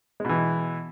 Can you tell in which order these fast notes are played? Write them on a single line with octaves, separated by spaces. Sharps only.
G#3 B2 E3